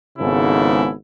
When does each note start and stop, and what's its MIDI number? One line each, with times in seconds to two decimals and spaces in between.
0.19 0.92 32
0.19 0.92 44
0.19 0.92 49
0.19 0.92 59
0.19 0.92 64
0.19 0.92 69